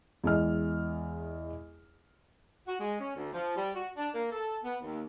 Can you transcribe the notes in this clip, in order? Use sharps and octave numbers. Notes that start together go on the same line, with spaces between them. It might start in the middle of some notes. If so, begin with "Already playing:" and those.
E2 G#3 F6
F#4
G#3
C#4
D2
F3
G3
F#4
D4
A#3
A4
B3
D#2